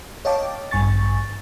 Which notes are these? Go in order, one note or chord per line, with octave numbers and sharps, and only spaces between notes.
C#5 D#5 F5 G5 A5 D6
A1 G2 G#5 C#6 A6